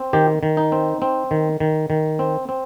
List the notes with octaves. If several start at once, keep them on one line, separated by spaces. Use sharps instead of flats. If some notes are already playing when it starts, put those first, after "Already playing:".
Already playing: C4
D#3 G4
D#3
D#4
C4
C4
D#3
D#3
D#3
C4
C4